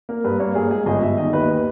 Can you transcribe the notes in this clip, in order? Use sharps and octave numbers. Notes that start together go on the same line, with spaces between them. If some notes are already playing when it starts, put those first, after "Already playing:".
A#3 A#4
G2 B4
A#3 C#5
G2 G#4
G#3 G#4
G1 D#5
G1 E5
D#3 D#5
D#2 B4